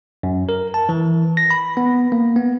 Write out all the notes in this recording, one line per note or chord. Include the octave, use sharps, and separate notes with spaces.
F#2
A#4
A5
E3
A#6
B5
B3
A#3
B3